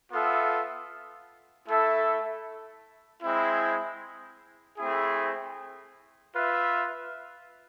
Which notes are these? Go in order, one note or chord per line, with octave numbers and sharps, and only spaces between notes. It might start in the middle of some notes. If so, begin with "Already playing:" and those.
B3 F4 A4 E5
A3 E4 A4 E5
G#3 C4 E4
A3 C4 E4 G#4
F4 B4 E5